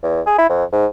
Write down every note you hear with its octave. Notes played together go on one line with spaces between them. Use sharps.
E2
G#4
E4
F2
G#2